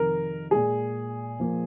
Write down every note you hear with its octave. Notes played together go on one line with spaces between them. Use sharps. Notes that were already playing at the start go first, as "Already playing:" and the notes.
Already playing: F2 C3 D#3 A#4
A#2 G#3 G#4
A#2 F3 A#3